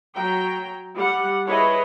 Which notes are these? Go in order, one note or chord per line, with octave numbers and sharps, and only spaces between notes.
F#3 G5 A#5
G3 F#5
E4 G#4 B4 C#5 D#5